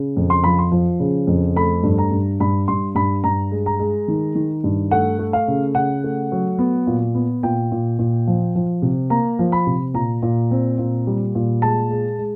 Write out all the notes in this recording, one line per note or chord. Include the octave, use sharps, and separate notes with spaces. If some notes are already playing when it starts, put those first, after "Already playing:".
Already playing: C#3
F2
C6
F3 B5
C6
F3
C#3
F2
A3 B5
G2
A#5
G2
G2 B5
G2 C6
G2 B5
G2 A#5
G#3
A#5
G#3
D#3
D#3
G2
A3 F#5
A3
F5
C#3
C#3 F#5
A3
F#3
B3
A#2
B3
A#2 G5
A#2
A#2
F3
F3
C3
A#3 A#5
F3
B5
C3
A#2 A#5
A#2
C4
A#2
G3
A#2
G#3 A5
G#3
G#3